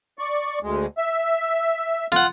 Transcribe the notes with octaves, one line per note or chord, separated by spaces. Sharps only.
D5 C#6
D2 G#3
E5
F4 F#5